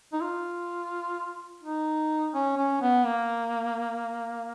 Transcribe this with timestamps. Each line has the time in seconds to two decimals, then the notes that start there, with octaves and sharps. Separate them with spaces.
0.13 D#4
0.21 F4
1.63 D#4
2.34 C#4
2.57 C#4
2.81 B3
3.05 A#3